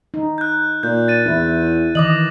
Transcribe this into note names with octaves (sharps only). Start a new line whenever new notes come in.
D#4
F#6 G6
A#2 G6
A6 D#7
E2 E4
D#3 E3 D#5 D6 D#6 F#7